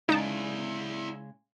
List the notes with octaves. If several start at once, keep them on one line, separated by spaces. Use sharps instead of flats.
C#3 G#3 D#4 E4 D5 A5